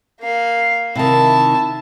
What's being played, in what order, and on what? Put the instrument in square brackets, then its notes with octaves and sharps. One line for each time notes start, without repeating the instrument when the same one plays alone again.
[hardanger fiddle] A#3 F5
[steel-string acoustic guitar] C3 D#3 [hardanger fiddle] E4 A5